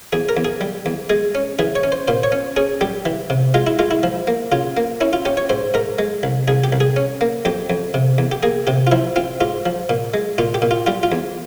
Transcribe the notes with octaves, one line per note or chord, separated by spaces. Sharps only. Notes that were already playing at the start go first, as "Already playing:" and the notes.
E2 G#4
A#4
E2
G#4
G3
E2
G#3 G#4
C#4
E3 G#4
C#5
C#4
C5
A#2 C5
C#5
C#4
C#4 G#4
G3 G4
E3
C3
G#3 F4
E4
G#3 F4
E4
F3
A#3
C#3 F4
A#3
C#4 E4
F4
C#4 G4
C#5
G#2 C5
G#2 A#4
G#3
C2
C2 G#4
G4
C2
G#4
C#4
A#3
F2 G4
F2
C3
E2
G4
A#3 G#4
C3 G4
F4
F3 E4
C4 F4
G#2 F4
F3
A#2
G#3
A#2 F4
G4
A#2
F4
G3 F4
F4
E2